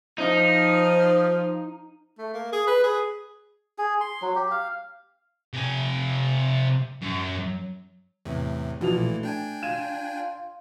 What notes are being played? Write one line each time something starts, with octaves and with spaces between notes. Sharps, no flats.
F3 D#4
A3
A#3
G#4
B4
G#4
G#4
C6
F#3
G4
F5
C3 G#5
F#2
E2 A2 C3
B1 A#2 E3 F3 F7
A3
D4 G5 G#5
F4 G#6 D#7 E7